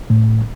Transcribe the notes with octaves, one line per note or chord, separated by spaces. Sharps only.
A2